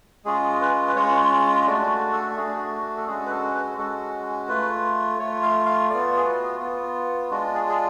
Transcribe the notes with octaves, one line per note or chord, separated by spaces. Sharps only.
G#3 C#4 F4 G#4
B4
B4
G#3 C#4 F4 C#5
A3 D4 F#4 D5
A4
A3 D4 F#4 G#4
A4
G#3 C#4 F#4 G#4
B4
A4
B4
G#3 C#4 F#4 A4
A3 F4 B4
A3 F4 C#5
F5
F5
B3 F4 D5
G#4
F#4
B3 F4
G#3 D4 F4 F#4
G#4
G#4